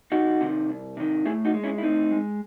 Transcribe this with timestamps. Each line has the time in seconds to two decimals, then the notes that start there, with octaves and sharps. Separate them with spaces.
0.12 C2 D#4 F#4
0.41 C3 D#3
0.69 C2
0.97 C3 D#3
1.25 A2 E4 G#4
1.45 D#4 F#4
1.54 G#3
1.64 C#4 E4
1.78 E4
1.83 A2 C4 D#4
2.11 G#3